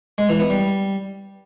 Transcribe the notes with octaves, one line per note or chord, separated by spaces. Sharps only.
G#3
E3
B3
G3